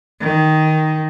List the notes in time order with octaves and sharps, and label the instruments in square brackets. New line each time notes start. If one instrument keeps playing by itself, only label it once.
[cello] D#3